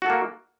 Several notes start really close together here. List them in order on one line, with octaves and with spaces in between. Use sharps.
F#4 A4 A#3